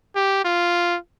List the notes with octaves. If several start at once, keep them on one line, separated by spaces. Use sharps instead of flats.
G4
F4